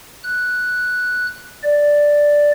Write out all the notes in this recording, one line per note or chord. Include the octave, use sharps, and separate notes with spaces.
F#6
D5